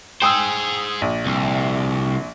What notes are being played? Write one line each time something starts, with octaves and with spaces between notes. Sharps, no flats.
G#4 C5 G5 D#6 E6
A#1
C2